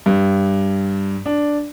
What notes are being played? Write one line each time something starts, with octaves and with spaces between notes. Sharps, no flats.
G2
D4